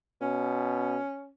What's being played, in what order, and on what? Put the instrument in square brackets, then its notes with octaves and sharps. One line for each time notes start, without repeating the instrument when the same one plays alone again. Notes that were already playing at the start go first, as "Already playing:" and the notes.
[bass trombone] B2 [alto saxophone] C#4